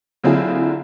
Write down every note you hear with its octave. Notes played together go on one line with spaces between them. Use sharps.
D3 F#3 C4 E4 F4 G#4